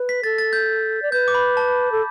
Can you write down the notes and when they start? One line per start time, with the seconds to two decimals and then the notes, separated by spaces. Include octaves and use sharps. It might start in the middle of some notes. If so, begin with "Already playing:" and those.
Already playing: B4
0.09 B6
0.24 A4 A6
0.38 A6
0.53 G6
1.02 D5
1.12 B4 G6
1.28 D6
1.35 B5
1.57 A5
1.92 A4